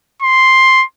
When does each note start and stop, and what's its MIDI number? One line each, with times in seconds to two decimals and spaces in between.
0.22 0.84 84